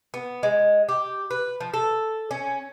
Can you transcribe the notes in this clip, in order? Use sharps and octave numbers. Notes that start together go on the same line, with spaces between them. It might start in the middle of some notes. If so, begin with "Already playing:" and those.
B3
G#3
G4
B4
F3
A4
C#4